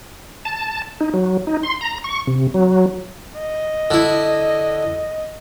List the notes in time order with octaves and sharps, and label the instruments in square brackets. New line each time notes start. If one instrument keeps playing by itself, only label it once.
[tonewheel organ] A5
D#4
F#3
D#4
C6
A#5
C#6
C3
F#3
[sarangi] D#5
[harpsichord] D3 E4